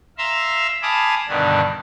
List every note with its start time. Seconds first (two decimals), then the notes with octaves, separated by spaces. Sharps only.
0.18 E5 F5 A#5 C6 E6
0.82 F5 G#5 A5 B5 D6 D#6
1.28 G2 B2 D3 D#3 D4